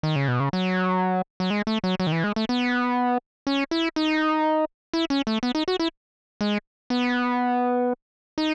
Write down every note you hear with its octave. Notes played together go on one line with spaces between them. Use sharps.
D#3
C#3
B2
C#3
F#3
F#3
G#3
A3
F#3
F#3
D#3
E3
G#3
A3
B3
C#4
E4
D#4
E4
C#4
A3
B3
D#4
F#4
E4
G#3
B3
D#4